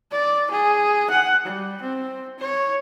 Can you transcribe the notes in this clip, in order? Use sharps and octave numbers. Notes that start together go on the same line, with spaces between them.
D5
G#4
F#5
G3
C4
C#5